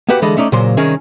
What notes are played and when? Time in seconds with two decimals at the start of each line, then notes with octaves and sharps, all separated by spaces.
0.09 A#3 B3 F#4 G4 B4
0.22 D3 E3 G#3 A4 D#5 B5
0.37 A3 C#4 D#4 D5
0.52 A#2 C#3 F#3 A#3 C5 C6
0.77 C2 D#3 C#4 G#4 A#4 C#5